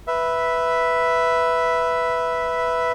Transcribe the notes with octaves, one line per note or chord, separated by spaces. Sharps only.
B4 E5